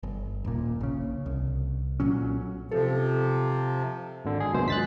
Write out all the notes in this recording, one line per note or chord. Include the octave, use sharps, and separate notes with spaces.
G1
D#1 A#2
A#1 C#3
C2
B1 A#2 F#3 C#4
C3 F3 A4
G#1 D3
G#4
G#1 C#2 F#2 B2 C5
F#6 A6 B6